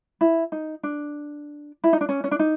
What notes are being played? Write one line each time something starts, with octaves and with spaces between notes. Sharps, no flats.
E4
D#4
D4
E4
D#4
D4
C#4
C#4
D4
D#4